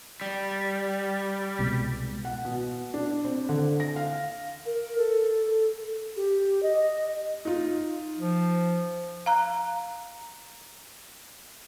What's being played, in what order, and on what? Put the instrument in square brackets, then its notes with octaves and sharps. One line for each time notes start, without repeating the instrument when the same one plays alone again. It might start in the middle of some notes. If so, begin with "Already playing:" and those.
[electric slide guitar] G3
[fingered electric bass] C2 B2 G#3
[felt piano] F#5
B2
D4
C4
D3
A#6
F5
[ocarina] A#4
A4
G4
D#5
[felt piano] D#4 F4
[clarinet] F3
[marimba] F5 A#5 F#6